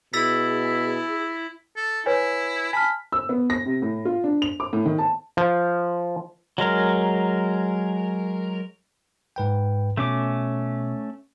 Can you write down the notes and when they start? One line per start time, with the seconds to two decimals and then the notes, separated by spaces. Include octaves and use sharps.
0.14 B2 E4 G#4 E6 A6 B6
1.76 A4
2.06 E4 B4 C#5 G#5
2.73 G#5 A5 B5 F6
3.12 E6
3.29 B3
3.50 A#6
3.66 C3
3.82 A2
4.05 F4
4.24 D4
4.42 F7
4.60 D6
4.73 A2
4.86 D#3
4.98 A5
5.37 F3
6.58 F#3 G#3 A#4
9.36 G#2 B4 G5
9.97 B2 A3 C#4 D6